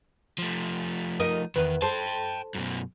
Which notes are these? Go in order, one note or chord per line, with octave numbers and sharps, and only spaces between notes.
F3 A3
D#4 A#4 D#5
E2 D#3 B4
A4 C5 G5 A5
F#2 B2